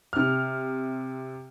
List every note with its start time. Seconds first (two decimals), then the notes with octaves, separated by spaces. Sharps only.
0.13 C3 F6